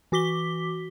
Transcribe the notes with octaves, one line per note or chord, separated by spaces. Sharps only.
E3 F#4 D6 B6 G7